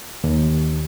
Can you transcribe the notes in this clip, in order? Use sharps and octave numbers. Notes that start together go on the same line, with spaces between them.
D#2